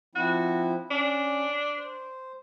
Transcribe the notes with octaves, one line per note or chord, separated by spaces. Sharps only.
F3 C4 E4 F#4
C#4 D4
C5